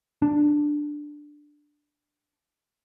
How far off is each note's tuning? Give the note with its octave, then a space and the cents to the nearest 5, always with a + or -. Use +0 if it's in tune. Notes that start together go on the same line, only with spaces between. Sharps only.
D4 +5